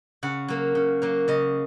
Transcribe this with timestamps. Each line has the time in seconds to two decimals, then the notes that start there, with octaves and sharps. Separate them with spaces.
0.23 C#3 F#5
0.48 F#3 A#3
0.75 C#3
1.02 F#3 A#3
1.28 C#3 D#5